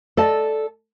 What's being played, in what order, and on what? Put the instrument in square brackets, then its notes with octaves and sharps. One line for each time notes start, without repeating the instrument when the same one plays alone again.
[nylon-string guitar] A4 D5 D#5 A5